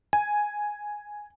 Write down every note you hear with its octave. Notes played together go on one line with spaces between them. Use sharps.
G#5